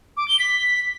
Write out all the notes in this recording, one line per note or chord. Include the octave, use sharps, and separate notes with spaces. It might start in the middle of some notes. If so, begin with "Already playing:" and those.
D6
G7
B6